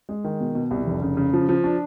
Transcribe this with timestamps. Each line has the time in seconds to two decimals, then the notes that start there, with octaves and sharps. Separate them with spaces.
0.09 G#3
0.24 D#3
0.40 B2
0.55 B2
0.71 C2
0.87 F1
1.02 C#3
1.17 C#3
1.33 F3
1.49 F3
1.64 D4